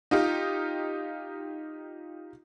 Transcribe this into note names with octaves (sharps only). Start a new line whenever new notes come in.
D#4 F4 G4